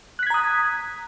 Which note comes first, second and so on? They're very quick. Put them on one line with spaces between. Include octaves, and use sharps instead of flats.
F#6 B6 G#6 A#5 D#6